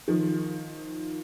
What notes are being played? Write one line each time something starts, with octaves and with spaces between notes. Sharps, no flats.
D#3 F3